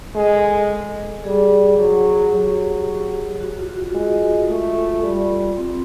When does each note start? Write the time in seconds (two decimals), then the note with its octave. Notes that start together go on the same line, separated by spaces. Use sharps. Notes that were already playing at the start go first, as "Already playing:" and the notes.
0.15 G#3 A4
1.24 G3 G#4
1.78 F#3
2.32 F#3 G4
3.40 F#4
3.59 F4
3.76 F#4
3.95 G#3 F4
4.49 A3 F4
5.03 G3
5.57 C4